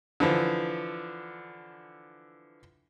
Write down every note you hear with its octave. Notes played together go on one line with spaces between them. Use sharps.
D3 E3 F3